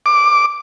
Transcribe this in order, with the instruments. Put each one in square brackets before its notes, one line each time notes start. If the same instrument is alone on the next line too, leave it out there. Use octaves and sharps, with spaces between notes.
[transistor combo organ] D6